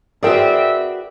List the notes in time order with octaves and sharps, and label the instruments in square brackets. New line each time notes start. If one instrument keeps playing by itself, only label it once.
[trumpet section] C4 E5 [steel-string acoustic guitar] F#4 B4 D5 [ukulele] G#4 A#4 G5